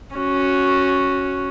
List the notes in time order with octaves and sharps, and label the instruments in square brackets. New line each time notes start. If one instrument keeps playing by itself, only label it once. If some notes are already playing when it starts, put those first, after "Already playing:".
[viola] C#4 F#4